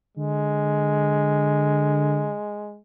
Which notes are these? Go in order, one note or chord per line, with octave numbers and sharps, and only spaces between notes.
D3 G#3